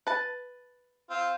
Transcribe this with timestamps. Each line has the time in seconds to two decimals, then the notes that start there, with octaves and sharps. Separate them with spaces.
0.07 B4 A5
1.10 C4 F4